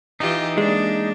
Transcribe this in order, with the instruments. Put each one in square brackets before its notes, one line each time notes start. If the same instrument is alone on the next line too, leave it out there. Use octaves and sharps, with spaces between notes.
[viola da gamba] E3 F4 G4 [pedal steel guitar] D#4
[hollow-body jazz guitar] G#3 [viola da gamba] A#3 D4